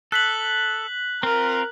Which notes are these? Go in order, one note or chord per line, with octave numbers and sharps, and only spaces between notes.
A4 F#6 B6 F#7
C4 F4 A#4